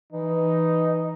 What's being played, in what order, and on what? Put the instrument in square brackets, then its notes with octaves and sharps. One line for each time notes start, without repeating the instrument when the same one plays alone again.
[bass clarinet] E3 [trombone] D#4